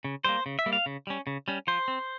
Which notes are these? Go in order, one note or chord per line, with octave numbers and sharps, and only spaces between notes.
C#3
G3 A#3 C5
C#3
E5
G3 A#3
F5
C#3
G3 C#4
C#3
G3 C#4
F3 C5
C4